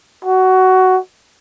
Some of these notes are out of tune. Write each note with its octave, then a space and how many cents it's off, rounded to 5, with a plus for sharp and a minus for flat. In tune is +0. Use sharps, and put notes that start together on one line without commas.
F#4 +15